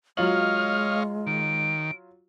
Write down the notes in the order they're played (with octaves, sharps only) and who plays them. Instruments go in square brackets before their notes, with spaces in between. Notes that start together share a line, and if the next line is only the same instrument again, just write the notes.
[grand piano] F#3 F4 F#7 [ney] G#3 [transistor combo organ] C#5 D#5 F5 [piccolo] F6
[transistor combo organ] D#3 [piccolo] D7